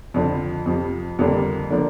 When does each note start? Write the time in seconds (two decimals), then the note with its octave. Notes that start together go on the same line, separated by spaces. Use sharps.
0.14 F2 D3 F3
0.66 F2 C3 F3
1.19 F2 D3 G3 A#3 D4
1.70 D3 F3 A#3 D4